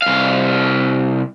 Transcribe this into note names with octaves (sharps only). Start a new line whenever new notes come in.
C2 F5